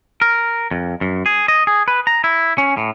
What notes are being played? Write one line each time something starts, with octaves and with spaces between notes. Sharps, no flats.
A#4
F2
F#2
G#4
D#5
G#4
B4
A#5
E4
C#4
A2